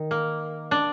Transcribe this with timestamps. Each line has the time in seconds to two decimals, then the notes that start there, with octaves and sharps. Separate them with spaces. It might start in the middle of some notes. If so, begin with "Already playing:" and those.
Already playing: D#3
0.11 A#3
0.71 D4